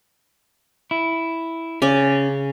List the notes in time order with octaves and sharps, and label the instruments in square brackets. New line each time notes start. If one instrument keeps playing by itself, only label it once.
[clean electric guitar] E4
[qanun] C#3 D5 G#5 [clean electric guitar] C#4